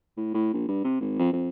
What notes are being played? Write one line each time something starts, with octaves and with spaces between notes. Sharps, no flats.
A2
A2
A#1
G2
C3
G#1
F2
F2